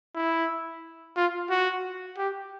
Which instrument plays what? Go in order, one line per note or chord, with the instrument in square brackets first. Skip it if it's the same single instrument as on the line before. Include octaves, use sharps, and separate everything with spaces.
[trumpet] E4
F4
F#4
G4